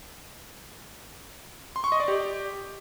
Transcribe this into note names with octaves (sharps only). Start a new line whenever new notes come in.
C6
C#6
D#5
D5
G4